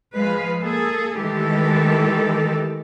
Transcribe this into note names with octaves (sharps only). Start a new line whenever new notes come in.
F3 G#3 B4 F5
A#3 G#4 A4
D#3 E3 G#3 A3 G4 A4